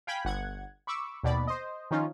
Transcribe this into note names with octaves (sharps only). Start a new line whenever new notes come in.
F5 G5 G#5 B5 G#6 B6
G1 F#5 G#6
B5 C#6 D6 E6
D#2 B2 D5 B5
C5 D#5
D#3 F3 C#4 D#4 F4